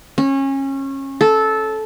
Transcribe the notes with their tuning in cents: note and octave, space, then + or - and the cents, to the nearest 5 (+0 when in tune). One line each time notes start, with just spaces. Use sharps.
C#4 -25
A4 -15